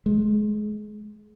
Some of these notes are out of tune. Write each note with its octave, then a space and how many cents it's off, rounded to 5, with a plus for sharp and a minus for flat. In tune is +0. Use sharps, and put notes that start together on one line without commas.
G#3 +25